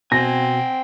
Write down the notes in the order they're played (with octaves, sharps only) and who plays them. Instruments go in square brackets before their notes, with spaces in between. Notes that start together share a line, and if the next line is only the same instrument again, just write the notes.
[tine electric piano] B2 [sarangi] C4 [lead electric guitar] G5 G#5 [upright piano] A#6